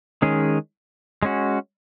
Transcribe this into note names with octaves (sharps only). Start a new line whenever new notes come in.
D#3 G#3 C#4 G#4
G#3 C#4 F#4